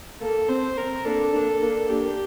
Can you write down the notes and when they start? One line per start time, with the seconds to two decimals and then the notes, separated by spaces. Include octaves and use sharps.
0.20 A#3 A4
0.49 C4 C5
0.77 C4 A#4
1.05 A#3 D4 A4
1.34 A#3 D4
1.62 A#3 D4
1.89 A#3 D4 G4